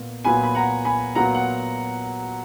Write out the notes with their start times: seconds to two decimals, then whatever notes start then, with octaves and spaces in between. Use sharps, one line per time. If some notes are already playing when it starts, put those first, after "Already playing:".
Already playing: A#2 B3
0.25 A#2 F#3 B3 G#5 B5
0.43 B5
0.55 F#5 A#5
0.85 G#5 B5
1.15 A#2 F#3 B3 F#5 A#5
1.35 F#5